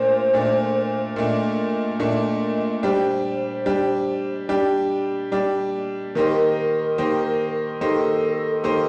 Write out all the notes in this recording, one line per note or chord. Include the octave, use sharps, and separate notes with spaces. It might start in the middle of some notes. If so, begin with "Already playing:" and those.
Already playing: A#2 A3 D4 C5
A#2 A3 D4
A#2 A3 D4 D#5
A#2 A3 D4 D#5
G3 D4 G4 C5
G3 D4 G4
G3 D4 G4
G3 D4 G4
D#3 A#3 D#4 G4 A#4 C5
D#3 A#3 D#4 G4 C5
D#3 A#3 D#4 G4 A4 C5
D#3 A#3 D#4 G4 C5